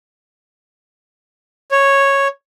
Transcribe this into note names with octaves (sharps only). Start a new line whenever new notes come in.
C#5